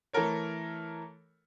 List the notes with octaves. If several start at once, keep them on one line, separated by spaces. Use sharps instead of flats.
E3 A3 A4 A#4 C#5